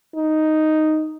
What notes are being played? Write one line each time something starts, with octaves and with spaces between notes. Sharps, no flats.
D#4